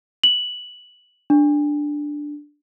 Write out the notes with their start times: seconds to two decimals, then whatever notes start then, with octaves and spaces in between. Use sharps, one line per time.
0.24 F#7
1.30 D4